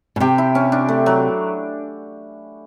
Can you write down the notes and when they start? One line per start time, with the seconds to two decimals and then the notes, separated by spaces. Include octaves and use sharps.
0.16 B2
0.20 C3 G4
0.38 E4
0.55 C#4
0.72 D4
0.89 A3
1.06 F#3